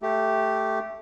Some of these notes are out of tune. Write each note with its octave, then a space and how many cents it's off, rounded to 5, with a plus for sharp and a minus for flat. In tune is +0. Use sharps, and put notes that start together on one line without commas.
A3 +0 G4 -5